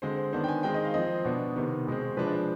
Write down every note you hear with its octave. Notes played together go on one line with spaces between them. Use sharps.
D3 G#3 C4 C5
C5
D#3 B3 D4 C5
G5
G#5
D#3 G#3 C4 G5
D#5
F5
F3 C4 D#5
B2 B3 D4
C3 D#3 B3
B2 G#3 C4
F3 G#3 D4 B4
D5
C5